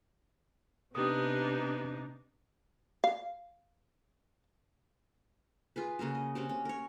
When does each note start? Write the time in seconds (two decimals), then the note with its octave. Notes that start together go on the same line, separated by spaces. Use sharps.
0.95 C3 B3 D4 D#4 G4 D#6
3.04 F5
5.76 F4 G#4 B4
5.99 C#3 A#3 C#4 F#4
6.15 D#5
6.35 C4 C#4 F#4 G4
6.49 C#4
6.65 A#4 C#5